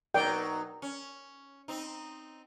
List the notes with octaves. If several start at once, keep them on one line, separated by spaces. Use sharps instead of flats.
B2 F#3 D#4 A#4 D5 G5
C#4
C4 D#4